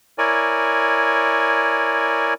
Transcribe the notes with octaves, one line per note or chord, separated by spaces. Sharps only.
E4 A#4 C#5 D5 G#5